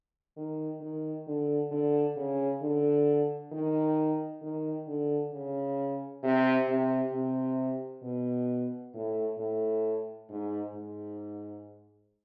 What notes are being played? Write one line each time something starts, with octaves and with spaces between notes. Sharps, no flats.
D#3
D#3
D3
D3
C#3
D3
D#3
D#3
D3
C#3
C3
C3
C3
B2
A2
A2
G#2
G#2